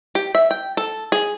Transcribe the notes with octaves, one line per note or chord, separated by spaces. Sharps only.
G4
E5
G5
A4
G#4